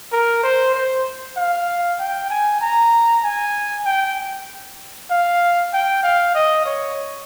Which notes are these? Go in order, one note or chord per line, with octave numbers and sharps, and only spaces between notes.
A#4
C5
C5
F5
G5
G#5
A#5
G#5
G5
F5
G5
F5
D#5
C#5